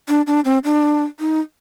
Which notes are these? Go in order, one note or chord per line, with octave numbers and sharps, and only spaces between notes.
D4
D4
C4
D4
D#4